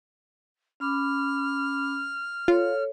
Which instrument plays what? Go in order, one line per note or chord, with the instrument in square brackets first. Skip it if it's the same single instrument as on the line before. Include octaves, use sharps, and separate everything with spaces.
[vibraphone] C#4 B5 D6 [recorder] F6
[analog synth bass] F4 [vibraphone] A4 C#5